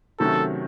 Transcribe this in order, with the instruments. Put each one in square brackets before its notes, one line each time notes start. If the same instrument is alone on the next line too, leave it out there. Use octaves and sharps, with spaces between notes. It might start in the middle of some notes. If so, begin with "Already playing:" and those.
[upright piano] C3 D#3 F#3 A3 C#4 [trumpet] A4